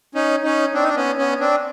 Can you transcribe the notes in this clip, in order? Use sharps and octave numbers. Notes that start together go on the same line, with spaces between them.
C#4 D#4
C#4 D#4
C4 D4
D#4
D4
B3 C#4
B3 C#4
C4 D4